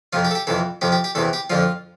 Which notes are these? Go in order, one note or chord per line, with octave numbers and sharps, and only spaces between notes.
F2 C3 F3 F4
G4
A4
G4
F2 C3 E3 A4
F2 C3 F3 G4
G4
G4
E2 C3 E3 A4
G4
F2 D3 F3 F4